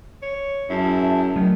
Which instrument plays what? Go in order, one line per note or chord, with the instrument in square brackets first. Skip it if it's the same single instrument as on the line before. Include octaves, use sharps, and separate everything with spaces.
[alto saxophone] C#5
[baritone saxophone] F#2 [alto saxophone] E4 [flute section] G#4 E5 A5
[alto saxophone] D#3 [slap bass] F#3 A3